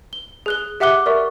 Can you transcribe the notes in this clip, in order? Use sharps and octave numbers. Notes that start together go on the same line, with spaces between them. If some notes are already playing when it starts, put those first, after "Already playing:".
G7
G#4 F#6 G7
G4 E5 F#5 D6 F#6 G7
A#4 D5 E5 C#6